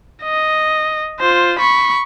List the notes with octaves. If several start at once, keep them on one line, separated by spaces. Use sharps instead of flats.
D#5
F4 C5
B5 C#6